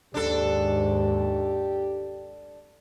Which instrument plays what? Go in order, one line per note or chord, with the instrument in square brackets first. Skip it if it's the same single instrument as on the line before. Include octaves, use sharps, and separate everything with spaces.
[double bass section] D#2 G#2 [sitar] D4 A4 [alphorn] G4